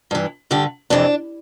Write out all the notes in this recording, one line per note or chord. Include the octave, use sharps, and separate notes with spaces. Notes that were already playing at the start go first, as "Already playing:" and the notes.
G2 E3
G2 D3 G4
F2 C3 E3 D4